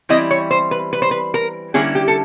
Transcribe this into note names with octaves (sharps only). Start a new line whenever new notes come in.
E3 G3 C4 E4 D#5
C#5
C5
B4
B4
C5
B4
A#4
D3 G3 A#3 C#4 E4 G#4
G4
A4